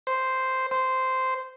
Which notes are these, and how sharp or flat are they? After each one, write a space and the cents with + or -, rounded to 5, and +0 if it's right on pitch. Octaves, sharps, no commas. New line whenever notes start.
C5 -5
C5 -10